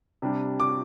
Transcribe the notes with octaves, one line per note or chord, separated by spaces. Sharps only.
C3 G3 D4
D6